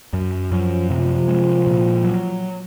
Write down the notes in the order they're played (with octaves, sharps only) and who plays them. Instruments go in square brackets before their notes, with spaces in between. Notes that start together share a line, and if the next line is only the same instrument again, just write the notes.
[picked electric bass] F#2 [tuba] F#3
[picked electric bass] F#2 [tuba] F3
[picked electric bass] C3 [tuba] F3
[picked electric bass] G#3
A#2
F#3